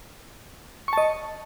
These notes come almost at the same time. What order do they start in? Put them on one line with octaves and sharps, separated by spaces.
C#6 A5 D#5